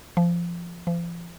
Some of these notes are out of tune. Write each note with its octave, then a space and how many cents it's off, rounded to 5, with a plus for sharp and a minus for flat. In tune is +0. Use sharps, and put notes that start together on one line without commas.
F3 -20
F3 -40